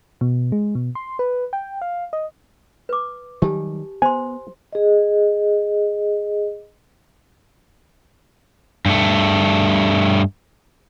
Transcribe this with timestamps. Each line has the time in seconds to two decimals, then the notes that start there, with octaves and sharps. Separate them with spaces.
0.21 B2
0.52 G#3
0.75 B2
0.95 C6
1.19 B4
1.53 G5
1.82 F5
2.13 D#5
2.89 B4 D6
3.42 D#3 F#3 G3 G4 G#5 A5
4.02 B3 C5 G#5 C6
4.73 G#4 D#5
8.86 G2 A3